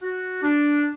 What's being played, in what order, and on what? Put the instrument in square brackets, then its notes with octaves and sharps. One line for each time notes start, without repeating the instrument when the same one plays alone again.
[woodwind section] F#4
D4